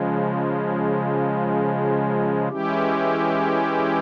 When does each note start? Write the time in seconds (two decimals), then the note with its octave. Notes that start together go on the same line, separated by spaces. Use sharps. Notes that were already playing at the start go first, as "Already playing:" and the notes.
Already playing: C#3 F3 G#3
2.49 E3 G#3 C#4 E4 G4